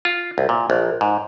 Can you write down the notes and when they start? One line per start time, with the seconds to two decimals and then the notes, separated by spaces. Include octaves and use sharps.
0.05 F4
0.38 C2
0.49 A#2
0.70 A#1
1.01 G#2